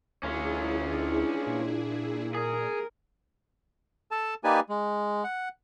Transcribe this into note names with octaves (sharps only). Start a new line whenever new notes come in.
D2 C#4 E4 F4 G#4
D4
A#2
G#4 A#4
A4 A5
A#3 D#4 G4 B4 D5 G#5
G#3
F#5